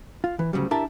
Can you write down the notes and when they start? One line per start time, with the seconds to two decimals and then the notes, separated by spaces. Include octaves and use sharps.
0.24 F4
0.39 E3
0.53 D2 C#3 F#3 G3
0.71 D4 E4 G4 A#4 E5 A5